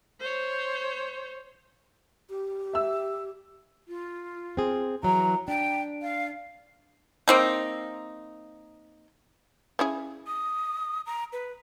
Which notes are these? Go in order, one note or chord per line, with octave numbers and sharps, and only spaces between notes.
C5 C#5
G4
E5 E6
F4
C4 G#4
E3 F#3 A#5
D4 G5
F5
A#3 C4 D#4
C#4 E4 G#4
D#6
A#5
B4